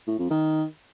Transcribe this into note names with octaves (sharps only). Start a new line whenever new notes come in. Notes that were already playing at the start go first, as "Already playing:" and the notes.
A2
F2
D#3